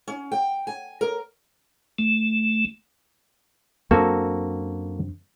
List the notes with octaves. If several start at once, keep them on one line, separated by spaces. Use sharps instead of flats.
C#4
G5
G#5
A#4
A3
F#2 A#3 C4 D4 F#4 A4